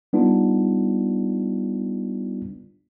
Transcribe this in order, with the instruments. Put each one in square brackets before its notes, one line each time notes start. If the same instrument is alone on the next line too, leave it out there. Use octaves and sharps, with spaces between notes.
[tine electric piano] G3 B3 D4 D#4 F4